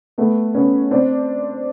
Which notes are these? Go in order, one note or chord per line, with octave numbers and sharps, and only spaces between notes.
A3 B3
B3 C#4
C4 D4